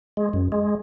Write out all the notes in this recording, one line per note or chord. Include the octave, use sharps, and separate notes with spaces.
G#3
F#2
G#3